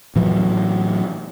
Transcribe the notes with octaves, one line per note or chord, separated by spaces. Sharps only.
A2 E3 F#3